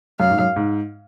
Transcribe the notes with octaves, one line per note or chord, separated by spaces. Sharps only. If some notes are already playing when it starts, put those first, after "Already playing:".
F#2 F5
G#2
F#2
G#2